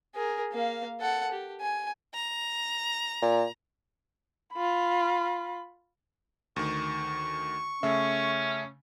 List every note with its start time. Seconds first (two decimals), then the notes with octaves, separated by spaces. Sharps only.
0.14 G#4 A#4
0.52 A#3 F5
1.00 A4 F#5
1.31 G4
1.61 G#5
2.14 A#5
3.22 A#2
4.53 F4 B5
6.56 D2 D#3 C#6
7.83 C#3 A3 C#4 E5